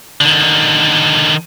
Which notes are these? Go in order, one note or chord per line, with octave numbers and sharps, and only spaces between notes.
D3 D#3